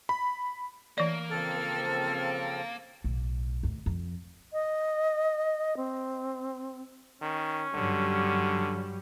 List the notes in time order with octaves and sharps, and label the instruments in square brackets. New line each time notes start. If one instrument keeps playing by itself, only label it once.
[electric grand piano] B5
[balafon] E3 D5 [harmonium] A3 [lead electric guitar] A#3
[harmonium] C#3 F3 C4 [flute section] A4 F6
[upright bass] B1 A2
D#2 A2
F2
[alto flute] D#5
C4
[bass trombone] D#3 [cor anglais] C#4
[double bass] G2 F#3 [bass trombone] D3 [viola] G3